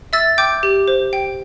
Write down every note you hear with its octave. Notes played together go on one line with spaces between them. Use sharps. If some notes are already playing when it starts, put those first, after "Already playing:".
E5 E6 A6
G5 D6 G6
G4
C5
G5